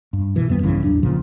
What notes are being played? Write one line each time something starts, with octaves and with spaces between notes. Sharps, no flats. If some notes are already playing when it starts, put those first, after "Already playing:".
G2
C#2 B2 E3
F2 D#3 G3 B3
A#1 G2 C#3 E3
A1 E2 F#3 D4
C#2 A#2 C#3 F3